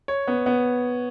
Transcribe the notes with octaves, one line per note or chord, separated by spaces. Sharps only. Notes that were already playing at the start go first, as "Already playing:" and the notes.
C#5
B3
B3